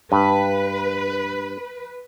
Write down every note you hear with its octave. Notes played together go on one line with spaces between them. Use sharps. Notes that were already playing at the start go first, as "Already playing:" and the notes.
G2 B4